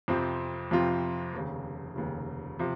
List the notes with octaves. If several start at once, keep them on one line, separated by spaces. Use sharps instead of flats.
F2 C3 F3 C4 F4
F2 C3 F3 C4 F4
F1 D#2 C#3
F1 D#2 C#3
C3 F3